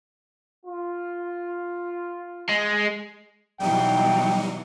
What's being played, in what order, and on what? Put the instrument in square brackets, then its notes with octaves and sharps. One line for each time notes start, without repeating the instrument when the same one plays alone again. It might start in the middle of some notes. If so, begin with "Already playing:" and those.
[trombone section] F4
[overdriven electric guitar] G#3
[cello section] B2 E3 F#3 [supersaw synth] G3 D#4 [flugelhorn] G5